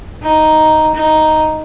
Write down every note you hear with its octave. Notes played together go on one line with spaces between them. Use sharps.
D#4
D#4